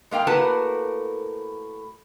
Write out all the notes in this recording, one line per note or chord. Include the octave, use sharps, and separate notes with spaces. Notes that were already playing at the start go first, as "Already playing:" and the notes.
G#3 A#3 F5 G5
A2 A#3 F#4 A#4 B4 A5